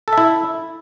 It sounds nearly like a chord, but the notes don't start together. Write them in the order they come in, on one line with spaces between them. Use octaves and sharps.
A4 E5 E4